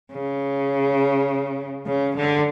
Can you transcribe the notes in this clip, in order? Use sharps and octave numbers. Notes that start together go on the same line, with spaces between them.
C#3
C#3
D3